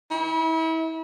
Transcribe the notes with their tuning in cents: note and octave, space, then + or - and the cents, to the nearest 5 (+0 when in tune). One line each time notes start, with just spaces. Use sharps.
E4 -35